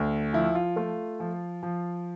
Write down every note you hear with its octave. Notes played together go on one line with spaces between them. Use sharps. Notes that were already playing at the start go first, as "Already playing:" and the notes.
Already playing: D2
F3 E4
F4
A3 F4
F3
F3